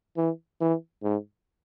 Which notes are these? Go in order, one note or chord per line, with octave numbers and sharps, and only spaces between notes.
E3
E3
G#2